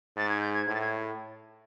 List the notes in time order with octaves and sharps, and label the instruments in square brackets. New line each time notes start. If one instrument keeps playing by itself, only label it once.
[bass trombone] G#2 [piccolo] A6
[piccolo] G#6
G6
G#6
[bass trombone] A2 [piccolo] G#6
[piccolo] A6
G#6